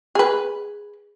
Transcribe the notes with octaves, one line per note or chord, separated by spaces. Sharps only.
G#4 B4